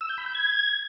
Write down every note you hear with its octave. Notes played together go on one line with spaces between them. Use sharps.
E6
G6
B5
G6
G#6